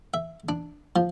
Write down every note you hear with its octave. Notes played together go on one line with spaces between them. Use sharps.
E5
D4
F3